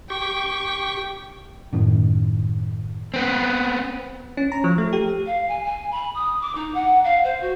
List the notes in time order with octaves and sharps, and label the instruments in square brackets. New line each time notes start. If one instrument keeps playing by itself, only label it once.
[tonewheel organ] G4 C#6 [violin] G5
[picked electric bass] F#2 A2 D#3
[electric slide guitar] B3 C4
[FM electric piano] C#4
A#5
F3
A3
G4
[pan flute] F5
G#5
G#5
B5
D#6
D6
D#4
F#5
F5
C5
F#4